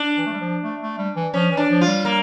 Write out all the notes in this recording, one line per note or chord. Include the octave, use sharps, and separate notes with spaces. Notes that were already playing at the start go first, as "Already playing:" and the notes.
Already playing: D4
E3
A3
G3
F3
A3
A3
G3
E3
F3 C#4
E3
D4
F3
F4
G3
A#3